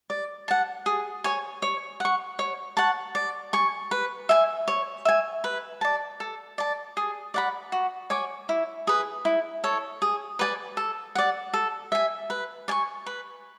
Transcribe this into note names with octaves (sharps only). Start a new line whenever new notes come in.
D5
F#5 A5
G#4
C#5 G#5 C#6
C#5
F#5 C#6
C#5
F#5 A5 C#6
D5
G#5 C#6
B4
E5 G#5
C#5
E5 G#5
B4
D5 A5
A4
D5 A5
G#4
D5 F#5 B5
F#4
C#5 G#5 D6
E4
G#4 B4
E4
A4 C#5
G#4
B4 D5 G#5
A4
D5 F#5
A4
E5 G#5
B4
D5 G#5 C#6
B4